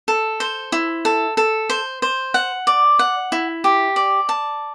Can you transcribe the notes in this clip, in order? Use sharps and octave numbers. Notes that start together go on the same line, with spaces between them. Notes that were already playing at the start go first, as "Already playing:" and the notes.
A4
C5
E4
A4
A4
C5
C5
F#5
D5
F#5
E4
G4
D5
A5